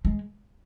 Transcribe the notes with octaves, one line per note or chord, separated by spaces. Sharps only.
G#3